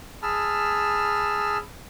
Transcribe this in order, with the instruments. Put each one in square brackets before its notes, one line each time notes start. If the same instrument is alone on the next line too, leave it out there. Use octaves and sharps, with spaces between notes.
[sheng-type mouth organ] G#4 A5 B5 E6 F6